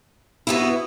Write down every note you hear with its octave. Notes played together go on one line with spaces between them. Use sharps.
B2 B3 E4